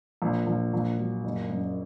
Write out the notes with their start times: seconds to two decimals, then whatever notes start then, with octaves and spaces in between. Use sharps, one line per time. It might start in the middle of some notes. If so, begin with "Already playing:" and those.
0.22 A#1
0.47 A#1
0.73 A#1
0.98 F#3
1.24 F#1
1.49 F#2